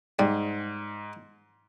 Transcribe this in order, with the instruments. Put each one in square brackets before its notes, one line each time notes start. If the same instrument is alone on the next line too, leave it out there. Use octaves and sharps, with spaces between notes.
[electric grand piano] G#2 [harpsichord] G3